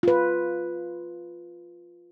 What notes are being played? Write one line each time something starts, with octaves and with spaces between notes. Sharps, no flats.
F4 B4